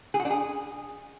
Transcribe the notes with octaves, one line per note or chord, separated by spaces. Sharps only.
G#4
F#4
D4
G#4